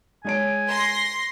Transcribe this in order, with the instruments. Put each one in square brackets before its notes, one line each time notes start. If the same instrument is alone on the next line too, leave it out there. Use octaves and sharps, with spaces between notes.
[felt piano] G#3 C#5 D7 [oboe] G#5
[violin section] C6 A#6